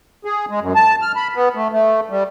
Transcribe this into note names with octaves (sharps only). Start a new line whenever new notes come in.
G#4
G#3
F#2
A5
F6
B5
B3
A3
A3
G3